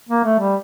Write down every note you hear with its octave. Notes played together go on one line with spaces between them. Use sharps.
A#3
A3
G3